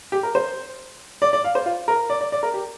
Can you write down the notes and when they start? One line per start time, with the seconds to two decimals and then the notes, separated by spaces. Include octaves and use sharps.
0.12 G4
0.23 A#4
0.35 C5
1.22 D5
1.33 D5
1.44 F5
1.55 C5
1.66 F4
1.88 A#4
2.10 D5
2.21 D5
2.32 D5
2.43 A#4
2.54 G4